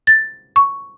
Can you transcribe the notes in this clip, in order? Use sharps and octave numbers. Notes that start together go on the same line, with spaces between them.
A6
C#6